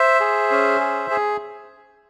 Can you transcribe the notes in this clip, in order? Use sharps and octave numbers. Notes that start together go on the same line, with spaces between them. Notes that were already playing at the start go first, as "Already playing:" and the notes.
Already playing: C5 E5
G#4
C#4
G#4
G#4